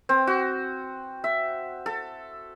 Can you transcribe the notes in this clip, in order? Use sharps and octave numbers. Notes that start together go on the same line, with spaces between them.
C4
F#4
E5
A4